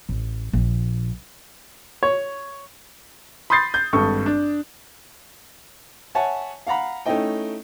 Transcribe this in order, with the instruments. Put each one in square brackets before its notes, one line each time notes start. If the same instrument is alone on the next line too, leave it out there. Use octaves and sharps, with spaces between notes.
[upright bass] A1
A#1
[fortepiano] C#5
[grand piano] B5 C6 D#6 G6 A6 C7
G6
G#1 G2 A4 C#6
D4
[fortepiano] C#5 E5 F#5 G#5 A5
F5 F#5 A#5 B5
A3 C#4 D#4 E4 D#5 G5